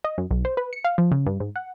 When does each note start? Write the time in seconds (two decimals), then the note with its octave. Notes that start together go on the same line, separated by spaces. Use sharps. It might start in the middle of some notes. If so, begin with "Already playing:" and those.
0.04 D#5
0.18 F#2
0.31 B1
0.45 C5
0.57 B4
0.73 C#7
0.84 F5
0.98 F3
1.11 C#3
1.26 G2
1.40 G#2
1.56 F#5